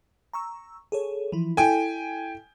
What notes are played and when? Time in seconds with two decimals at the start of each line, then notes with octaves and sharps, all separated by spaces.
0.33 A#5 C#6 E6
0.92 G#4 A4 C#5
1.32 E3 F3 E4
1.57 E4 A4 G5 G#5